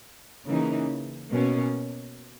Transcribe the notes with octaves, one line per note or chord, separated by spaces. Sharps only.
C#3 E3 A#3 D#4
B2 A#3 C#4